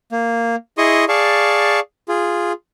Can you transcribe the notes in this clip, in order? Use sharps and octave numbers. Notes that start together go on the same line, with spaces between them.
A#3
E4 G#4 D#5 C6 C#6 D#6
G#4 D5 F5 A5 C#6
F4 G#4